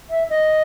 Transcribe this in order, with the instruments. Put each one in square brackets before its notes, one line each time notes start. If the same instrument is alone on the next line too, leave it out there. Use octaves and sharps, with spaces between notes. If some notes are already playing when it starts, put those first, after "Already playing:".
[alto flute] E5
D#5